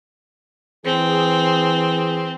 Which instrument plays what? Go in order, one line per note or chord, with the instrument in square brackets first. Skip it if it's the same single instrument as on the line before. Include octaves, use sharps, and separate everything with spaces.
[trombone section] E3 G#4 [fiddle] C4